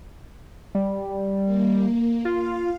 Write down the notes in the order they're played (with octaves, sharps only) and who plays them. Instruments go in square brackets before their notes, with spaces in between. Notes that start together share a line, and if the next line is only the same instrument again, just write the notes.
[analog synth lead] G3
[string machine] A#3
[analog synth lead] F4 [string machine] F5